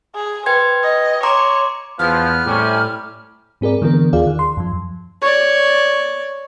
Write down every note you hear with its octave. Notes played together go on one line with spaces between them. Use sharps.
G#4
B4 C5 G5 G#6
D#5
C#5 A#5 C6 D6
E2 F3 B3 F6
A2 C3 G3 C#4
G#2 C4 G#4 A#4 D5
D3 E3 B3 A#4
D#2 F4 G#4 D5 F5
D#3
C6
F#2 F3
C#5 D5